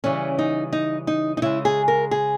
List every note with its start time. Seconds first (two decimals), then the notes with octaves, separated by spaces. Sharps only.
0.04 C#3 E3 G3 C#4
0.39 D#4
0.73 D#4
1.07 D#4
1.37 D#4
1.42 C#3 G#3 E4
1.65 G#4
1.88 A#4
2.11 G#4